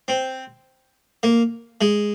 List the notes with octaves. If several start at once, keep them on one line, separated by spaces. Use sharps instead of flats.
C4
A#3
G#3